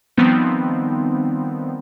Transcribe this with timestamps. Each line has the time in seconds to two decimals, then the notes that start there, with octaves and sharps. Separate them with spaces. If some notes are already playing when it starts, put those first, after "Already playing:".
0.17 D#3 F3 G3 B3 C4 D#4